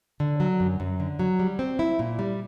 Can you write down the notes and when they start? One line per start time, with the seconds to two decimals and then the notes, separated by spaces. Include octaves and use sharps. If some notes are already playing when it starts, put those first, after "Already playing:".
0.20 D3
0.40 F#3
0.60 F#2
0.80 F#2
1.00 D3
1.19 F#3
1.39 G3
1.59 C4
1.79 E4
1.99 A#2
2.19 G3